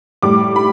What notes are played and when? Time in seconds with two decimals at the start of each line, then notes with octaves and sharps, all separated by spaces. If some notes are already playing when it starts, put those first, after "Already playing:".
0.22 A2 G3 D6
0.56 B5